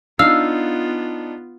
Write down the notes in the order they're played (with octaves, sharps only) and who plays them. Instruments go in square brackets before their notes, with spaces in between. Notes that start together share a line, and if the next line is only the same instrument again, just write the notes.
[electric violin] B3 F4 [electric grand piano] D4 D#4 [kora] F5 [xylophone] E6